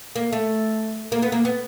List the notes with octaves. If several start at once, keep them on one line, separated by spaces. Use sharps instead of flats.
A#3
A3
A#3
B3
A#3
B3